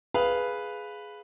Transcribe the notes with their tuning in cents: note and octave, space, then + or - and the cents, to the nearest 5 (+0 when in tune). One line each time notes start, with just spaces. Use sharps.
G#4 +5 B4 +0 F5 +0